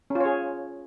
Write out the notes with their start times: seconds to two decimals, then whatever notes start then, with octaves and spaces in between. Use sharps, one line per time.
0.10 C#4
0.15 F4
0.20 C#5
0.25 G#4